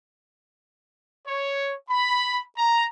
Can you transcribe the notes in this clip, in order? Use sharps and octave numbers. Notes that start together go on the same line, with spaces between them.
C#5
B5
A#5